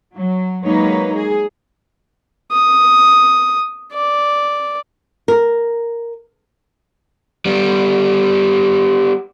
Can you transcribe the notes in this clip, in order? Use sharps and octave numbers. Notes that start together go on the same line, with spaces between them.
F#3
F#3 G#3 A#3 D#4 B4 C#5
G#4
D#6
D5
A#4
G3 B3